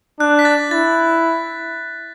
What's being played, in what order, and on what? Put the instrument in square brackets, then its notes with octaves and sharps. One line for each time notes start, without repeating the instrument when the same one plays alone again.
[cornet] D4 [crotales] F#6
[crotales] B6
A6
[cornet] E4 [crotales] A6